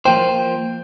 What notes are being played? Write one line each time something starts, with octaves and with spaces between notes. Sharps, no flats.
F3 A#3 F4 C5 G5